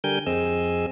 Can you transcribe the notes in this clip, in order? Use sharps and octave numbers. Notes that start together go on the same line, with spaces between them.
D3 G3 A#4 G5 G#5 G6
F2 C4 G#4 D#5 E6